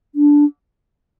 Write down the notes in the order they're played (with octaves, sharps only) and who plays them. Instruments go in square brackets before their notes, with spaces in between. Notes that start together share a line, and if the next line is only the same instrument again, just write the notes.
[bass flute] D4